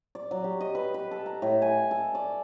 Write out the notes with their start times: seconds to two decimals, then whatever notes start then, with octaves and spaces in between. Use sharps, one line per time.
0.15 D5
0.31 F#3
0.44 G4
0.60 D#5
0.75 B4
0.94 B4
1.11 A4
1.26 A#5
1.42 A2
1.62 G#5
1.91 A4
2.15 D5